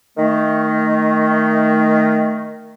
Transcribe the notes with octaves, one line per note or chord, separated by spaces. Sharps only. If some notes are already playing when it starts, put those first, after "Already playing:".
D#3 A3